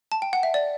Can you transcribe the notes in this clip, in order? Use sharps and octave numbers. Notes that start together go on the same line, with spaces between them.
A5
G5
F#5
E5
D5